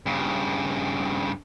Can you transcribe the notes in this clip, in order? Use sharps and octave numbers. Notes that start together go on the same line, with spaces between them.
G2 C#3